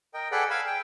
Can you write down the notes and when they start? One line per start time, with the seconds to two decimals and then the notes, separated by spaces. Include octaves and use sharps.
0.14 A#4 D#5 G5
0.31 G#4 A4 B4 D5 F#5 G5
0.50 F5 G#5 B5 E6
0.67 G5